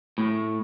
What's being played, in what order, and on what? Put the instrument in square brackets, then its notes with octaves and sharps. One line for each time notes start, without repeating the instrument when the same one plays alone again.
[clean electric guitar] A2